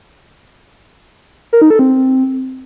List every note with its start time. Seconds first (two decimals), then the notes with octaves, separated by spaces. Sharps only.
1.53 A#4
1.62 D#4
1.70 A4
1.79 C4